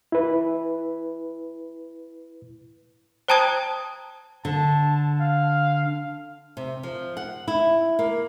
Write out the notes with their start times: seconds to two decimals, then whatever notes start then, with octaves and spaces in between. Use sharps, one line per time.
0.12 E4 B4
3.28 C5 G5 A5 A#5 D#6 G#6
4.45 D3 A5
5.20 F5
6.57 C3
6.83 F3
7.17 F#5
7.48 E4
7.99 A#3